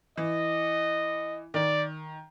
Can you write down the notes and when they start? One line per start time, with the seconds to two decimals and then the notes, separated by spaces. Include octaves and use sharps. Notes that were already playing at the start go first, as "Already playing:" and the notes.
0.17 E3 D#5
1.54 D#3 D5